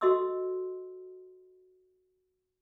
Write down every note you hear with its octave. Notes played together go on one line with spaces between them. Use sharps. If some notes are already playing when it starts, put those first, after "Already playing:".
F#4 A4 D#5 C6 D#6 E6